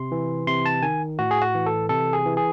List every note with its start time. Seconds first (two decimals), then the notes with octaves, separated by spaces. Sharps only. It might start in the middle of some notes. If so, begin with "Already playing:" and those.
Already playing: C3 C6
0.12 E3
0.47 C3 C6
0.66 A5
0.82 D#3 G#5
1.19 A2 F#4
1.31 G#4
1.42 F#4
1.54 E3
1.66 A4
1.89 C3 A4
2.13 G#4
2.26 E3
2.37 G#4